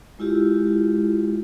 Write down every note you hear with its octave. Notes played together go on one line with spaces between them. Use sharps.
G#3 E4 F4 G4